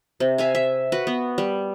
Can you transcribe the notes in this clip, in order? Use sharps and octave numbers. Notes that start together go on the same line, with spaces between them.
C3
E5 F5 G#5
E5
F#4 B4
B3
G3